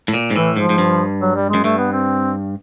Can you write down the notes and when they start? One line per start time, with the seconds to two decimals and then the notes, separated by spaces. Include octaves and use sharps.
0.08 A2
0.14 A#2
0.30 G#2
0.35 A2 E3
0.57 G#2 F3
0.69 G#2
0.78 G2
1.21 F#3
1.35 G3
1.49 F#2 G#3
1.64 G2 A3
1.78 B3
1.92 C4